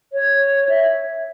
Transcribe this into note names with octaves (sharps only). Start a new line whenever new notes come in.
C#5
E5